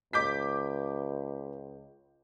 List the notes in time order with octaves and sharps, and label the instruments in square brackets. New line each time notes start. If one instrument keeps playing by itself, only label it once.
[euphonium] C#2 [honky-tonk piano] D6 G6 B6